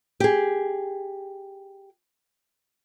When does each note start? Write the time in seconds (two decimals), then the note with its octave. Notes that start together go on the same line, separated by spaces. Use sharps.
0.20 G4 G#4